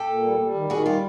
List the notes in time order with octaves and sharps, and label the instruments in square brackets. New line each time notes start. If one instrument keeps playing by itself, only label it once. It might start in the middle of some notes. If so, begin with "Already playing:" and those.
Already playing: [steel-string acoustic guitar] G4 A4
[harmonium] A#2
G3
G3
D#3
[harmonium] D#3 [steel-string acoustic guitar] F#4 G#4
[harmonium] G3 [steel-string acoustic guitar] F4 G4